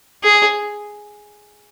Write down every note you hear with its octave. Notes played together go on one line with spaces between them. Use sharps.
G#4